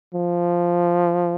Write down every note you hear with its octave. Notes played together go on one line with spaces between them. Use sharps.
F3